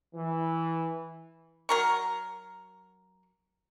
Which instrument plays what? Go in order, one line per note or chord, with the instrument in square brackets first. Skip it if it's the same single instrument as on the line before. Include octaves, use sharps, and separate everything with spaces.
[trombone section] E3
[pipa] F#3 A#4 C#6